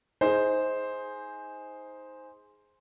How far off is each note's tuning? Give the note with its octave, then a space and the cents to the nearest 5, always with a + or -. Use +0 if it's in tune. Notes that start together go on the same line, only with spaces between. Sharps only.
D#4 +25 G#4 +0 C5 +0